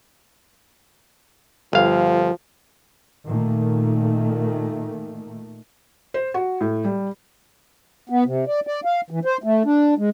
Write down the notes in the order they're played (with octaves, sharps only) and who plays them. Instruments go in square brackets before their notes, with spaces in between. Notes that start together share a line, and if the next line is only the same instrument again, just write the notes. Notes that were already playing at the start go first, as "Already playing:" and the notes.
[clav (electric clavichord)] G1 F5 [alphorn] F3
[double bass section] A#2 D#3 A3
[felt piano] C5
F#4
A2
G3
[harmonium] B3
C3
D5
D5
F5
E3
C5
A3
D4
G#3